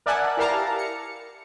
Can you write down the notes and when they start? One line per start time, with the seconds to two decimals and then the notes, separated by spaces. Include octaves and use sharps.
0.06 A#4 D5 E5 F#5 G#5 A5
0.37 E4 G4 A#4 F5 A5 A#5
0.78 C#7